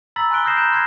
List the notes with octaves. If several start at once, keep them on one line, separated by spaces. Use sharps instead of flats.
A#5 B5 E6 A6 B6 F#7
G#5 C6 F#6 B6 D7 G7
D#6 F6 G6 A#6 C7 E7
A#5 B5 F#6 G6 D7 E7
C6 F6 G6 G#6 A#6 C7